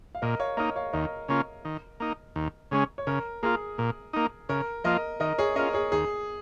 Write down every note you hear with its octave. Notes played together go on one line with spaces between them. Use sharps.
F5
A#2 A#4 D#5
C#5 F5
A#3 D#4 A#4 D#5
C#5 F5
D#2 A#4 D#5
C#3 A#3 C#4 F4
D#3
A#3 D#4
D#2
C#3 G#3 C#4
C#5
C#3 A#4
A#3 F4 G#4
A#2
A#3 D#4
C#3 A#4
F3 A#3 F4 A#4 D#5
D#3 A#4 D#5
G#4 C#5
C#4 F4 A#4 D#5
G#4 C#5
D#2 G#4